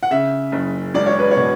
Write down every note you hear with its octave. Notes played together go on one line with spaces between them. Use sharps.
F#5
C#3 E5
F#1
E1 D5
C#5
B4
C#5
B2